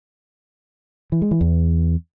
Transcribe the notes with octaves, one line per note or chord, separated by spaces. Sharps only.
E3
G#3
E3
E2